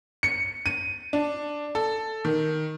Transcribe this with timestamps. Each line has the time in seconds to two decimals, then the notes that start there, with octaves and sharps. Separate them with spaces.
0.23 C#7
0.66 D#7
1.13 D4
1.75 A4
2.25 D#3